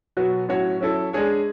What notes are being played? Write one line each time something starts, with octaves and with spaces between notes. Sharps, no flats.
B2 F#3 B3 F#4
A2 F#3 C#4 F#4 C#5
F#3 C#4 E4 A4
G#3 D4 G#4 C#5